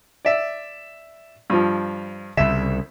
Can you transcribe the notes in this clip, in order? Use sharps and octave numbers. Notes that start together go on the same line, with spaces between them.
D5 E5
G2 F3
C2 C#3 E5